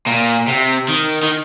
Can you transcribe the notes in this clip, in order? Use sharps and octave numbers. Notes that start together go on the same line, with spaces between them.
A#2
C3
D#3
D#3